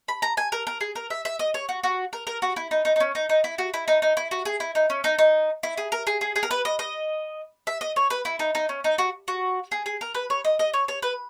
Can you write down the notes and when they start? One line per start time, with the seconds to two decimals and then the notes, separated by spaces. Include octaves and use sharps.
0.08 B5
0.22 A#5
0.37 G#5
0.52 A#4
0.67 A#4
0.81 G#4
0.95 A#4
1.10 E5
1.25 E5
1.39 D#5
1.54 C#5
1.69 F#4
1.84 F#4
2.13 A#4
2.27 A#4
2.42 F#4
2.56 E4
2.71 D#4
2.85 D#4
2.96 D#4
3.00 C#4
3.15 D#4
3.29 D#4
3.44 E4
3.58 F#4
3.74 E4
3.88 D#4
4.02 D#4
4.17 E4
4.31 F#4
4.45 G#4
4.60 E4
4.75 D#4
4.90 C#4
5.04 D#4
5.19 D#4
5.63 E4
5.77 G#4
5.92 A#4
6.07 G#4
6.21 G#4
6.36 G#4
6.43 A#4
6.51 B4
6.65 D#5
6.79 D#5
7.67 E5
7.81 D#5
7.96 C#5
8.10 B4
8.25 E4
8.39 D#4
8.55 D#4
8.69 C#4
8.84 D#4
8.98 F#4
9.28 F#4
9.72 G#4
9.86 G#4
10.01 A#4
10.14 B4
10.30 C#5
10.45 D#5
10.59 D#5
10.74 C#5
10.88 C#5
11.02 B4